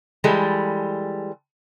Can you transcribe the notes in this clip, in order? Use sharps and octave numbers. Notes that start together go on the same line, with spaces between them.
E3 G3 G#3 A4